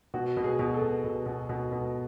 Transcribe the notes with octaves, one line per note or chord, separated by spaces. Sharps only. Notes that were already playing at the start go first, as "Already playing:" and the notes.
B2 F#4
B2
G#4
B2
A4
B2
B2
B2
B2
B2